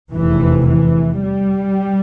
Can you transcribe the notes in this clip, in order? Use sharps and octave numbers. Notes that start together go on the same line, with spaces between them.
F1 E2 C3 E3
E3
G3